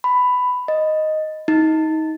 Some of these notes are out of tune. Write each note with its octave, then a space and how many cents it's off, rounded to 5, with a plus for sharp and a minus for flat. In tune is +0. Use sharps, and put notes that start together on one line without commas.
B5 +10
D#5 +0
D#4 +25